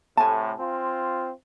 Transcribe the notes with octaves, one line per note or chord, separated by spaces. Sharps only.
A2 C3 A3 G#5 A5
C4 F4